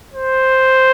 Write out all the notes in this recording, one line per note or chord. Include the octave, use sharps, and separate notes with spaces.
C5